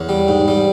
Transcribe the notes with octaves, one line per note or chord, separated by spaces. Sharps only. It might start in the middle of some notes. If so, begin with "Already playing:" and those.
Already playing: E2 C#5
G3
G#2
G3